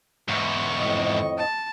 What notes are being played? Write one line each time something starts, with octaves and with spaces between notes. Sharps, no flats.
E2 G#2 C#6
F2 A2 D#5
A5